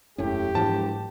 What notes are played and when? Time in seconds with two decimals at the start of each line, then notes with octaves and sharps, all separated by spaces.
0.18 E1 F#2 A2 C#4 G4
0.55 E1 G#2 F3 F#3 A5